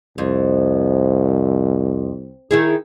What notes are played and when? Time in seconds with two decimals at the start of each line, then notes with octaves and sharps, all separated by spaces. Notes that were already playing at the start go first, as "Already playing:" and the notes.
0.18 C2 F2
2.51 D#3 E4 G#4